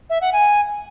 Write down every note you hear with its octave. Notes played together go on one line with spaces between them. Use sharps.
E5
F#5
G#5